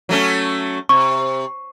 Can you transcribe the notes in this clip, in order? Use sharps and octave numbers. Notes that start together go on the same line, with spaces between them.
F#3 A3 C#4
C3 C#6